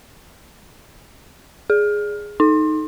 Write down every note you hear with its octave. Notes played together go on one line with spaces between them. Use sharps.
G#4
D#4